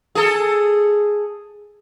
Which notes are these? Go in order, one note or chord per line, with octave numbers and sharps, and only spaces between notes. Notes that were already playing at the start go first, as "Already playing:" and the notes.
G#4 A4